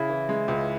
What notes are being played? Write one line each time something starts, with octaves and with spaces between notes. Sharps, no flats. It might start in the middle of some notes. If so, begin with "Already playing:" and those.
Already playing: C#3 E4
E3
G#3
C#2